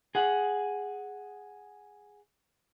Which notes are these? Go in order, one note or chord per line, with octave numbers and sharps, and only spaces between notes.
G#4 F#5